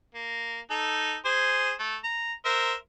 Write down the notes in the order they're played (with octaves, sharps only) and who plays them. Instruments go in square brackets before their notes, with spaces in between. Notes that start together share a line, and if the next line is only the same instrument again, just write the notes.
[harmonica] A#3
D#4 A4
G#4 C5 G#5
A3
A#5
A#4 C5 E5